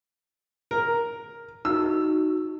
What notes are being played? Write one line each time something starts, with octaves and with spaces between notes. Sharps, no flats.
A#4
D#4 F#4 E6